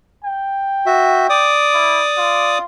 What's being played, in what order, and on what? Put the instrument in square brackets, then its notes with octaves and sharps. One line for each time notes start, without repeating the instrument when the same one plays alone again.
[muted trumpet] G5
[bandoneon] F#4 E5
D5 D6 D#6
[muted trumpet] E4
F4